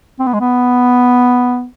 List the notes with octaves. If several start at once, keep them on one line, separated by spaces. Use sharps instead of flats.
C4
B3
G#3
B3